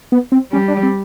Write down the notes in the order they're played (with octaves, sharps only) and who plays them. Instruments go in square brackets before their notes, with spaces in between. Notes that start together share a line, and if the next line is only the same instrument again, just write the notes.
[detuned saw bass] B3
C4
[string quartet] G3 [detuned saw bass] C#4
[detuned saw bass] D4
C4